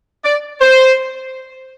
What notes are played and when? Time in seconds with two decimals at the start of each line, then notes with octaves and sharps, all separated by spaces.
0.24 D5
0.60 C5